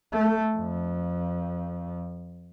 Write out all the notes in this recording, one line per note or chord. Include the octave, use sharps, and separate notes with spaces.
A3
F2